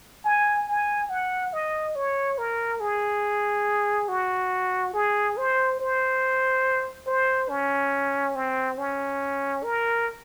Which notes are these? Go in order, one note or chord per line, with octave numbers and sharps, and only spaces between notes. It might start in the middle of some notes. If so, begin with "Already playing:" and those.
G#5
G#5
F#5
D#5
C#5
A#4
G#4
F#4
G#4
C5
C5
C5
C#4
C4
C#4
A#4